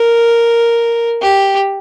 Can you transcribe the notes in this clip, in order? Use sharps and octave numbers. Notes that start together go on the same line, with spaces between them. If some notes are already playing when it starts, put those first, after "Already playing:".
Already playing: A#4
G4